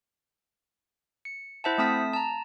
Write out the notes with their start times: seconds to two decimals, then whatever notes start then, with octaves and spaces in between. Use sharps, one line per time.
1.25 C#7
1.64 E4 C5 E5 F#5 A5
1.78 A3 C4 A5 D#6 B6
2.13 A5 A#5